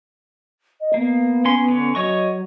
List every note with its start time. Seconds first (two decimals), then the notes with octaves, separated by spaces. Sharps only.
0.81 D#5
0.94 A#3 B3
1.45 C#4 C6
1.68 D3 C#4
1.95 F#3 C#5 D#5 C#6